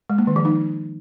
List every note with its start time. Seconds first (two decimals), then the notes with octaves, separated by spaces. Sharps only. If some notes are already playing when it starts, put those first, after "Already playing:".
0.10 G#3
0.18 A#3
0.27 D#3
0.36 F3
0.45 D#4